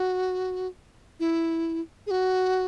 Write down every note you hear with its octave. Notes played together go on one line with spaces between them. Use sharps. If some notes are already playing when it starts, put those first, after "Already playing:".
Already playing: F#4
E4
G#4
F#4